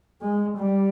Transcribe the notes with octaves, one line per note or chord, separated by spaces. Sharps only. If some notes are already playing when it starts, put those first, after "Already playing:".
G#3
G3